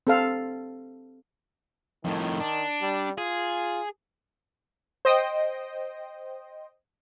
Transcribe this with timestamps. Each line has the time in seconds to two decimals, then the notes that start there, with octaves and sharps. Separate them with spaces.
0.07 C4 A4 F5
2.05 F2 A2 D#3
2.40 D4
2.81 G3
3.18 F4 G#4
5.05 C5 D#5 G5